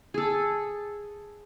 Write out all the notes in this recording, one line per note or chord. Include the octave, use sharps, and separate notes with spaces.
G#4 A4